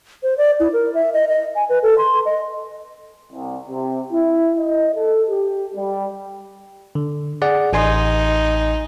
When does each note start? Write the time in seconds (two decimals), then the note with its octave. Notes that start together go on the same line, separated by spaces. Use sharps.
0.23 C5
0.38 D5
0.60 E4
0.73 A#4
0.94 E5
1.13 D#5
1.28 D#5
1.56 G#5
1.69 B4
1.83 A4
1.98 C6
2.25 D#5
3.33 C2
3.69 C3
4.12 E4
4.59 D#5
4.95 A4
5.29 G4
5.75 G3
6.95 D3
7.42 G#4 D5 F#5
7.73 A1 D#4 G#5 C6